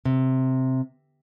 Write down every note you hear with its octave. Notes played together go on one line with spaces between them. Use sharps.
C3